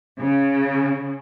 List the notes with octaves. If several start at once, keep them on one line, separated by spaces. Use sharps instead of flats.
C#3